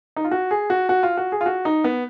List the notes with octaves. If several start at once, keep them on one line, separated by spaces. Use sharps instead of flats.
D#4
F4
F#4
G#4
F#4
F#4
F4
F#4
G#4
F4
F#4
D#4
B3